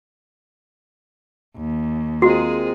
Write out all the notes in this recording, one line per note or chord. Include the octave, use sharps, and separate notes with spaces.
D#2
G#3 C4 F4 F#4 G#4 A#4